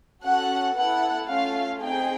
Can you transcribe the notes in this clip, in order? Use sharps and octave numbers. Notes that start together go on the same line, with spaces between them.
C#4 F#4 A4 F#5
B3 E4 A4 F#5
A3 C#4 F4 A4 F5
C4 D#4 G#4 G5